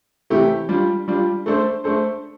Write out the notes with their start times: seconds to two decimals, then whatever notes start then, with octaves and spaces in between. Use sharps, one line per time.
0.30 C3 E3 A3 E4 G4
0.69 G3 D4 F4
1.08 G3 D4 F4
1.46 A3 D4 A4 C5
1.84 A3 D4 A4 C5